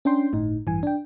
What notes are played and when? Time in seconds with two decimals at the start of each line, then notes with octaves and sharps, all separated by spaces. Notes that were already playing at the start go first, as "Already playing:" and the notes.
0.05 C#4 D4 G5 C6
0.33 G1 A2 D#4
0.67 A1 G2 E3 G#5
0.83 D4 G5